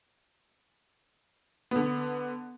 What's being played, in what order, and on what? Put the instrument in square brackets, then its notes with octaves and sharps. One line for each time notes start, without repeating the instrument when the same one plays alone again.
[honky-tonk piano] D3 B3